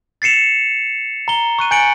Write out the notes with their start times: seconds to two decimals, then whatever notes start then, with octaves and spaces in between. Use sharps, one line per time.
0.22 A6 C7 C#7 E7 F7
1.28 A#5 G7
1.59 C#6 F#6 D#7
1.71 G#5 G6 A6 C#7 D7 F#7